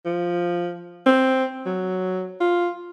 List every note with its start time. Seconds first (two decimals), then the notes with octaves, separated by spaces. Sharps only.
0.06 F3
1.06 C4
1.66 F#3
2.41 F4